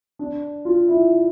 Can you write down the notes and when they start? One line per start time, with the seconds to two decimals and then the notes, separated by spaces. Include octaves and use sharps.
0.19 D4
0.65 F4
0.88 E4